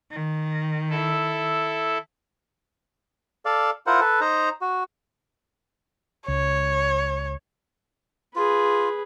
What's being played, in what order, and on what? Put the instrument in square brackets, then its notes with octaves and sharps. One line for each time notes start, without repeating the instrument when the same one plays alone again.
[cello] D#3
[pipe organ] E4 A4
[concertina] A4 D5 F5
E4 F4 A#4 C5 F#5
A4 B4
D#4 C5 A#5
F#4
[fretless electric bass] C#2 [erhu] C#5
[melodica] F4 [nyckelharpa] G#4 B4